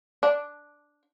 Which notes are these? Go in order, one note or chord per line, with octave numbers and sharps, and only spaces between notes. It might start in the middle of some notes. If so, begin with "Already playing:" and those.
D4